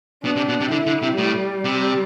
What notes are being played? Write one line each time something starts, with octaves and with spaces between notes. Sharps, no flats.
B2 D4
C3
B2
C3
D3 E4
D3
C3
A2 G3
C3